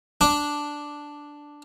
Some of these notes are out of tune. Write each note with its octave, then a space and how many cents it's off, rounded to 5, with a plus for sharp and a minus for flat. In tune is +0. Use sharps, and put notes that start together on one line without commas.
D4 +0 D6 +0